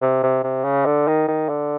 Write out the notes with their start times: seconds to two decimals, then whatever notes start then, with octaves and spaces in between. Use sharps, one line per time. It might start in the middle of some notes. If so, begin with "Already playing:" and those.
0.02 C3
0.23 C3
0.44 C3
0.64 C#3
0.86 D3
1.07 D#3
1.28 D#3
1.49 D3